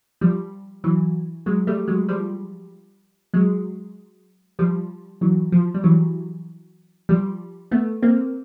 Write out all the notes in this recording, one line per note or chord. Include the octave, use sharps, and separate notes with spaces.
F3 G3
E3 F#3
F#3 G#3
G3 A3
F#3 G#3
F3 G3
F#3 G#3
F3 G3
E3 F#3
F3
G3
E3 F#3
F3 G3
A3 B3
A#3 C4